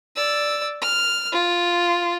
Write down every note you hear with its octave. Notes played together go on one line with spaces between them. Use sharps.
D5 E6
F6
F4